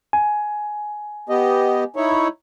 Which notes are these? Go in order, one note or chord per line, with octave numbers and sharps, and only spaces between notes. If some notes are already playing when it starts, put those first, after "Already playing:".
G#5
B3 G4 D#5
D#4 E4 C#5